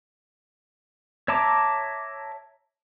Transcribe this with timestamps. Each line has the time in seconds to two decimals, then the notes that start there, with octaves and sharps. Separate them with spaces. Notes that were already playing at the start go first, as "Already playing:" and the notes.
1.28 C#5 E5 A5 A#5 D6